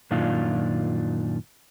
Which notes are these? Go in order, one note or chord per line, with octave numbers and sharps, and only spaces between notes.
F#2 A#2 D#3 D4 F4